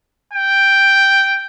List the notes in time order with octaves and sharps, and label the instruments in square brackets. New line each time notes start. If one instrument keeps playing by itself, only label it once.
[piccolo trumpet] G5